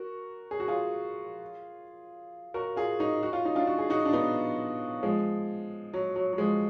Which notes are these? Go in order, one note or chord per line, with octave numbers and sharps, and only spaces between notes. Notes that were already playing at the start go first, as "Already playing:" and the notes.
Already playing: F#4 A#4
G#4
F#4
F4 G#4
F#4 A#4
F4 G#4
D#4 F#4
F#4
F4
D#4
D4 F4
F#4
G#4
D#4 F#4
D4
B3 D#4
F3 G#3
F#3
F#3
F#3
F3 G#3